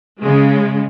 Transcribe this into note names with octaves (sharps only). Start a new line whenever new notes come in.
C#3 G#3